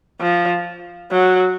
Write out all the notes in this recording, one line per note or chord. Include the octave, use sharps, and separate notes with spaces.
F3
F#3